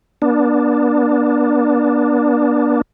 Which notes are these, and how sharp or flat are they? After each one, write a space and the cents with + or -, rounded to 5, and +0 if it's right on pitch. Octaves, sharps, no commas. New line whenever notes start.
B3 -40 D4 +0